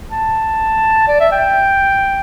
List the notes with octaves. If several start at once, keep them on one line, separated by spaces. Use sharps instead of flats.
A5
D5
E5
G5